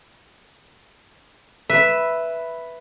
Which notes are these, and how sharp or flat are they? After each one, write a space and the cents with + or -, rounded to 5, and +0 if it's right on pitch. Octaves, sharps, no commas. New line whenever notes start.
B4 +0 E5 +0